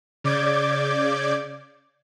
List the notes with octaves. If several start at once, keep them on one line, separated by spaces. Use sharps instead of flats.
C#3 D5 D6 G6 G#6